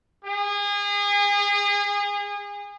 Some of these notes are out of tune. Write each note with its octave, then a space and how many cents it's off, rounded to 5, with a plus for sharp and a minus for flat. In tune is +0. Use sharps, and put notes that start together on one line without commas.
G#4 -30